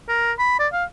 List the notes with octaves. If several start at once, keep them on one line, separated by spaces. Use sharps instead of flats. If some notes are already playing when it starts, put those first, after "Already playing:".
A#4
B5
D5
F5